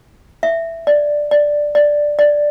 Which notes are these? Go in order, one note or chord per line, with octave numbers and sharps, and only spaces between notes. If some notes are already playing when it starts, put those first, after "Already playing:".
E5
D5
D5
D5
D5